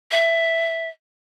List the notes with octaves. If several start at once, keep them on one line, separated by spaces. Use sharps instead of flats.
E5